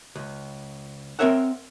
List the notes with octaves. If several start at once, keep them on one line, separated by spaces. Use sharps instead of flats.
C#2
C4 D#4 A#4 C#5 E5 F#5